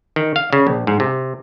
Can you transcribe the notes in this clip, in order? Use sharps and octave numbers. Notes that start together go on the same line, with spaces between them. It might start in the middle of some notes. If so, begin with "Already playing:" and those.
D#3
F5
C#3
A#1
G#2
C3